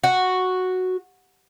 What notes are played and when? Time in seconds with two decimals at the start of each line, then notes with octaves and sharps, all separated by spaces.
0.04 F#4